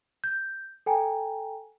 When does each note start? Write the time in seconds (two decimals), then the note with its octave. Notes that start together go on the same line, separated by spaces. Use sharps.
0.24 G6
0.86 A4 G5 G#5 A#5